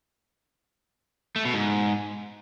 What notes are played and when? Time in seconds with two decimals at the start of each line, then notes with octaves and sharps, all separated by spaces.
1.36 A3
1.45 B2
1.54 G#2